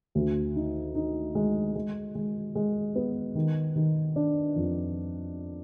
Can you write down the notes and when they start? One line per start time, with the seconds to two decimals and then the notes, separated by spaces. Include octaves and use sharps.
0.15 D2
0.56 D#4
0.95 D#4
1.35 G#3
1.75 G#3
2.15 G#3
2.55 G#3
2.95 B3
3.35 D#3
3.76 D#3
4.16 D4
4.56 F2